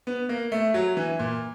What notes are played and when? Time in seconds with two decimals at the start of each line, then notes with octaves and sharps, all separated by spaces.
0.07 B3
0.29 A#3
0.52 A3
0.74 F#3
0.97 E3
1.19 A#2